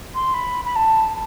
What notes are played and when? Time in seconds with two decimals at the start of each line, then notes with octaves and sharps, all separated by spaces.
0.14 C6
0.34 B5
0.65 B5
0.76 A5